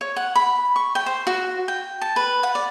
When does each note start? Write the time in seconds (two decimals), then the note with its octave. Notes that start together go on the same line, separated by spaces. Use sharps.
0.01 C#5
0.16 F#5
0.35 B5
0.76 C#6
0.95 G5
1.06 C5
1.27 F#4
1.68 G5
2.01 A5
2.16 B4
2.43 F#5
2.55 D5